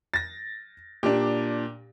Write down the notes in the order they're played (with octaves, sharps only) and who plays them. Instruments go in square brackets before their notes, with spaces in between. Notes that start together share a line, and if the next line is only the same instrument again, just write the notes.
[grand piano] A6 A#6
[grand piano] A#2 D4 [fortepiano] G4